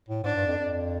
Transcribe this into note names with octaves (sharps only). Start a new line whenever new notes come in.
A2
G#2 D4
G2
F2
F2